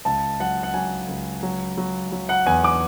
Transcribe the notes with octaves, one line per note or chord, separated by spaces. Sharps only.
C#2 A5
F#3 F#5
F#5
F#3 G#5
C#2
F#3
F#3
F#3
F#5
E2 G#5
D6